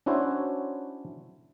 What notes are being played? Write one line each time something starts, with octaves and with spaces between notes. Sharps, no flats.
C#4 D4 E4 F#4 C5 C#5